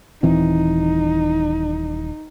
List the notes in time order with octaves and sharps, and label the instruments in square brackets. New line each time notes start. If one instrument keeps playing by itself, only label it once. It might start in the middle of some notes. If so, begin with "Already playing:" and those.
[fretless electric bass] D#1 E3 C4 [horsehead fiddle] D#4